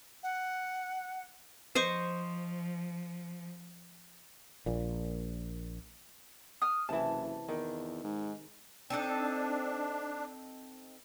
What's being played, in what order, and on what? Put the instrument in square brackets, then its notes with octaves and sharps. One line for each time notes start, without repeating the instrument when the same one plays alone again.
[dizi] F#5
[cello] F3 [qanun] C5 D#5 C#6
[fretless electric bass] A#1 A#2
[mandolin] D#6 F6
[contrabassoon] F#1 [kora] C3 E3 [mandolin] A5
[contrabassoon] E2 [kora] D#3
[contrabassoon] G#2
[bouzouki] C4 D#4 A4 [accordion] D4